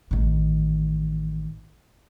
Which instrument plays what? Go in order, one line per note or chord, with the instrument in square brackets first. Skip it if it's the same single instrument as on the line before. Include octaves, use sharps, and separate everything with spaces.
[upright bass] A1 D#3